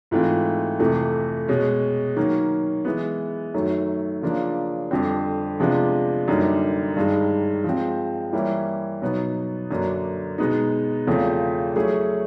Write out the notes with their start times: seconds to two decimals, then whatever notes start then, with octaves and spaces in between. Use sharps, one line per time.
0.11 G#2 E3 A3 C4 F4
0.79 F2 C3 E3 A3
1.48 B2 G#3 C#4
2.16 D#3 F#3 A#3 C#4
2.85 E3 G#3 B3
3.54 F#2 D#3 F#3 A3
4.22 C#3 F3 A#3 D4
4.91 F2 D3 G3 C4
5.60 C3 F3 G#3 B3 D4
6.28 F#2 D3 G3 A#3 D#4
6.96 G2 D#3 G#3
7.64 F3 G#3 C4
8.33 E3 G3 A#3 C#4 E4
9.02 B2 F#3 B3 D#4
9.71 F#2 D3 F#3 A#3 D4
10.38 B2 G#3 B3 D#4
11.07 E2 C#3 F3 A3 C4
11.75 F#3 A3 C#4 E4 G#4